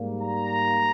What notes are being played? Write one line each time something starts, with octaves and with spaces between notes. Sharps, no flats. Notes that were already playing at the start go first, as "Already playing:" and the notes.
Already playing: G#2 G3 A#3
A#5